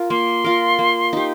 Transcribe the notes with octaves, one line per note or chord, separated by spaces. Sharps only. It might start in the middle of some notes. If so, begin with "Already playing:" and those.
Already playing: F4 A#4
A#3 C6
F4 A#4
A#3
D#4 G4